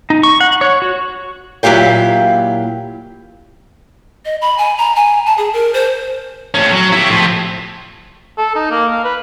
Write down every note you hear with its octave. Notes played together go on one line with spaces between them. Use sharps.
D#4
C#6
F#5
C#5
F#4
A#2 F#3 E4 G4 F5 G5
D#5
B5
G#5
A#5
G#5
A5
G#4
A#4
C5
A2 C#4
F#3
E4 G4
A2 F3
A4
D#4
A#3
F5
B4